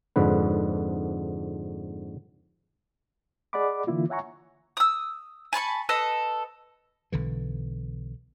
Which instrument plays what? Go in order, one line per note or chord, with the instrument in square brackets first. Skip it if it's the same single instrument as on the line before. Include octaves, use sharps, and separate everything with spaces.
[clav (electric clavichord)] F2 G#2 D3 B4
[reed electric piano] G#4 D5 D#5 F#5 B5 D6
D3 E3 A#3 E4 F4
C#5 E5 F#5 G#5 A#5 C#6
[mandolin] D#6 E6
G#5 A5 B5 C#6
A4 B4 D#5 D#6
[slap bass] B1 D3 E3